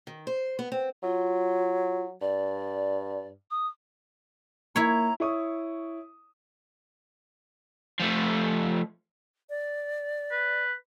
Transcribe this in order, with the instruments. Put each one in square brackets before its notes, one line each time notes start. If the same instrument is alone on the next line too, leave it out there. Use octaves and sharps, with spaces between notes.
[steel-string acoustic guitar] D#3
C5
B3
C4
[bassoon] F#3 [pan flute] F4
[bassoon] G2 [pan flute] D5
[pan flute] D#6
[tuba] A#3 [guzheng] E4 C#5 [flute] A#5
[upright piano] E4 C#5 C#6 D#6
[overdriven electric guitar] F3 A3
[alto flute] D5
[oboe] B4